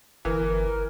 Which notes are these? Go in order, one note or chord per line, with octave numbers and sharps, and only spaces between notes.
G1 E3 A#4